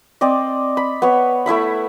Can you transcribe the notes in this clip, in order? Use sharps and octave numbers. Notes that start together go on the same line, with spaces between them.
C4 D5 D#5
B5
B3 C#5
A3 E4 E5 B5